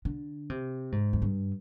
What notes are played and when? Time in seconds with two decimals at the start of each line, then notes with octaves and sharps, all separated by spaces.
0.05 D3
0.50 C3
0.92 G#2
1.13 F2
1.22 G2